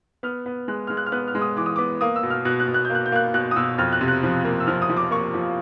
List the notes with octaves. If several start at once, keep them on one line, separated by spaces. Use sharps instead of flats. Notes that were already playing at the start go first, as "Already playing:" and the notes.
B3 F6
B3
G#3 F#6
G#3 F6
F#6
F6
B3 F#6
F6
G#3
D#6
E3 D6
D#6
B3 D6
A#3 D#6
E6
B2
F6
B2 F#6
F#6
B2
F#6
A#3 G6
F#6
G6
A#3 F#6
B2 F#6
D#6
B2 E6
F2 F6
F#6
C3
F#6
F3
A#3
E6
F3 F6
D#6
F3
D6
A#3 C#6
F3